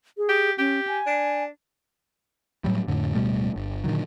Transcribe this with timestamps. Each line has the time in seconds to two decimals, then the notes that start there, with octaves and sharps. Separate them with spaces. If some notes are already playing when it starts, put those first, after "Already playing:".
0.18 G#4
0.29 G4
0.58 C#4 G4
0.87 G#5
1.07 D4
2.64 A2 F#3 G3
2.88 F2 A2 D3
3.15 D1 B2 G3 A3
3.56 G1
3.84 A#2 D3 D#3 F#3